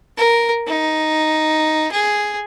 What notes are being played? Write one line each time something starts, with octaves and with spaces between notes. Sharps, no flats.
A#4
D#4
G#4